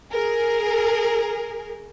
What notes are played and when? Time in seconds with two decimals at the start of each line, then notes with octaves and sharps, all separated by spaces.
0.12 G#4 A#4